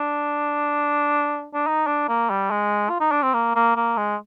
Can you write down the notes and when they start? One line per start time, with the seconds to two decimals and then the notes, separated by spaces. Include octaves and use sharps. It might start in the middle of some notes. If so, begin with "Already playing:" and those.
Already playing: D4
1.54 D4
1.67 D#4
1.87 D4
2.08 A#3
2.30 G3
2.50 G#3
2.89 F4
3.00 D#4
3.11 D4
3.22 C4
3.34 A#3
3.55 A#3
3.76 A#3
3.97 G#3